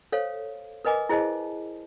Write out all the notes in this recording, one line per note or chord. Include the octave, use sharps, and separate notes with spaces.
A4 C5 C#5 F5
A#4 B4 D#5 G#5 D6
E4 G#4 C5 D#5 A5